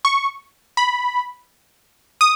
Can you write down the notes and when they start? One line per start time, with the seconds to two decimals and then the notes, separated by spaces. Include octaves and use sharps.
0.05 C#6
0.77 B5
2.21 D#6